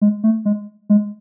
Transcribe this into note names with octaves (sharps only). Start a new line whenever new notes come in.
G#3
A3
G#3
G#3